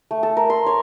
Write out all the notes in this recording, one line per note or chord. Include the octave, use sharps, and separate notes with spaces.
A3
A4
A#4
C6
C#5